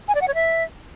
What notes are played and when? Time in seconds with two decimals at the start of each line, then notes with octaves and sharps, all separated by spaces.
0.08 G#5
0.15 D5
0.21 F#5
0.28 C#5
0.34 E5